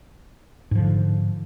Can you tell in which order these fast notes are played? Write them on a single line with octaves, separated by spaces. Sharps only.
G#2 F3 D3